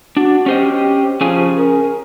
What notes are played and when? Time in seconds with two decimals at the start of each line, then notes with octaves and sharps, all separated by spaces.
0.17 D4 F#4
0.46 C#4 G4 C5 D#5
1.21 F3 C#4 G#4 G#5
1.58 A#4